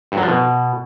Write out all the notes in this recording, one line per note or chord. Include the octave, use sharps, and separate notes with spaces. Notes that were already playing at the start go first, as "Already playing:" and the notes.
G2
F#3
F3
B2